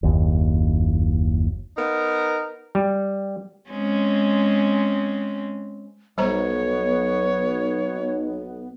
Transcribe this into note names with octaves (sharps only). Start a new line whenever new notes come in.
F#1 D#2
B3 D#4 A#4
G3
G#3 C4 C#4
B1 G3 B3 C5 C#5 A#5